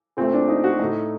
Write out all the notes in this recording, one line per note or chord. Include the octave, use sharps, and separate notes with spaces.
A#2 A3 C4
D4
D#4
F#4
A2 A3 D#4